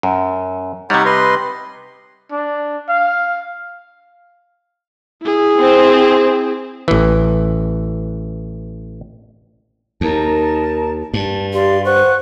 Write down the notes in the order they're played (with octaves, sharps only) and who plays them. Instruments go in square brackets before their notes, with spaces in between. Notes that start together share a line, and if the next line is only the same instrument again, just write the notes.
[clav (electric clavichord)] F#2
[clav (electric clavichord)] C3 G3 [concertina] D#4 C#5 F#5
[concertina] B4 D#5 C6
[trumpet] D4
F5
[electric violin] E4 G#4
[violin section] C4
[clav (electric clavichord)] A1 E3
[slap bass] D#2 [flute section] D#4 A#4 A5
[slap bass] G2 [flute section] A5
[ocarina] G4 [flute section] D5 F5 C6
[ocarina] C5 [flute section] F#5 C#6 F#6